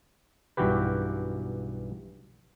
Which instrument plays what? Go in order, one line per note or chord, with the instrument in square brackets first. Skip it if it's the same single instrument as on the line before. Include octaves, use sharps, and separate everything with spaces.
[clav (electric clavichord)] B1 G2 E3 F#4 G4 B4